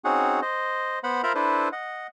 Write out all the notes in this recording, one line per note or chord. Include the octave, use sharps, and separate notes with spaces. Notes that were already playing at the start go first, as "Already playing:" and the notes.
C4 C#4 D#4 F#4 G#4 F#5
C5 D#5
B3 C5 F#5 B5
F4 A#4 C5 E5 A#5 B5
D4 E4 A4 B4 C5
D#5 F#5